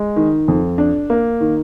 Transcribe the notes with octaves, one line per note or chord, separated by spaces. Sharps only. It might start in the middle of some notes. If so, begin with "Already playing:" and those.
Already playing: G#3
D#3
F2
D4
A#3
D#3